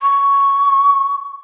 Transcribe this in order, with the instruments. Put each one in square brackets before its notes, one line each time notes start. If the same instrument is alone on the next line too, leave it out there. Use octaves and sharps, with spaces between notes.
[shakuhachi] C#6